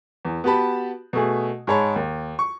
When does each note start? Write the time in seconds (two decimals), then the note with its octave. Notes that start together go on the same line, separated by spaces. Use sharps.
0.25 E2
0.44 B3 F#4 G4 A5 B5
1.13 B2 A3 G#4
1.67 G#2 G#4 C#5 A5 B5
1.96 D#2
2.39 C#6